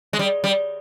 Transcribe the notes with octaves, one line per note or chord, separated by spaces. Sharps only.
G#3
G3
G3